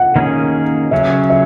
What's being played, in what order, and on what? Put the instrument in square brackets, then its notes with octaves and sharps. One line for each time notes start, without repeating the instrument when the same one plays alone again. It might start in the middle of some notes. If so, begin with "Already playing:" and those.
Already playing: [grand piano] F#5
[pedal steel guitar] D#3 A#3 C#4 G#4
[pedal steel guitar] C#3 F#3 C#4 [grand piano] E5
[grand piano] E5